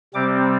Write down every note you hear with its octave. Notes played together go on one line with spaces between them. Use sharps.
C3 G3 C4 D6